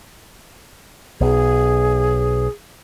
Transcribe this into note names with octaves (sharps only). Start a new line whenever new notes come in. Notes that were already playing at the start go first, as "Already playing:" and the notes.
B1 G#4